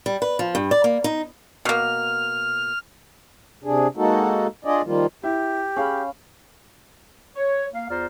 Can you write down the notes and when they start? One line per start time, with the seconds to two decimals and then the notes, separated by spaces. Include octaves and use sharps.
0.06 G3
0.22 B4
0.39 F3
0.55 G2
0.71 D5
0.84 A#3
1.04 D#4
1.65 B2 A#3 F6
3.64 C3 D4 G#4
3.97 G#3 A#3 D#4 F#4 A4
4.65 D4 F4 G#4 D5 D#5
4.85 D#3 F3 G3 A#3 F4
5.23 E4 G4
5.76 C#4 G#4 F5 B5
7.36 C#5
7.74 A#3 F5
7.90 E2 F4 C5 D5 A#5 F6